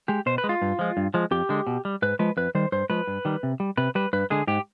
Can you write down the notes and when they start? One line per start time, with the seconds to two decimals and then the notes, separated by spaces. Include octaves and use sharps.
0.08 G#3 G4
0.26 B2 C5
0.38 B4
0.44 G#3
0.49 F4
0.62 G2
0.79 F3 G#3
0.97 G2
1.14 F3 G#3
1.31 F2 G4
1.49 D3 G#3
1.67 B2
1.85 G3
2.02 G#2 B4
2.19 F3 G#3 B4
2.37 F2 B4
2.55 D#3 G3 C5
2.72 G2 C5
2.90 F3 G#3 B4
3.07 G2
3.25 D#3 G3
3.43 C3
3.60 G3
3.77 C3 B4
3.95 G3 B4
4.13 G2 B4
4.30 D3 G#3 G#4
4.47 G#2 G4